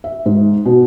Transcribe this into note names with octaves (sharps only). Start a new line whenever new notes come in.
E5
G#2
B2